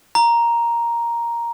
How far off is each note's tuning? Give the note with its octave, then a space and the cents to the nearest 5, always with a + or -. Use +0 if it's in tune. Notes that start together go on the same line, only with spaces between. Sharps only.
A#5 +5